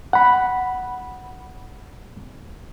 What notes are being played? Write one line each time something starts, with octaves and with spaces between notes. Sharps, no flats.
F#5 B5